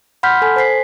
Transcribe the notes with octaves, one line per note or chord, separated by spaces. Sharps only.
F#5 B5 C6 F6 G6 B6
A4 G#5
C5 G#5 B6 C7